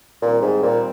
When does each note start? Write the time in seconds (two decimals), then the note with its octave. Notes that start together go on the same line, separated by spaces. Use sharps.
0.22 A#2 D#3 G3 C4
0.42 G#2
0.62 A#2